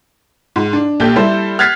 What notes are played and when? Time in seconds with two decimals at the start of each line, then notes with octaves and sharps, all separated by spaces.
0.56 G#2
0.73 D4
1.00 A#1 G4 A4 G6
1.16 G3 E4 A4 C5
1.59 F6 F#6 G#6 A6 B6 C7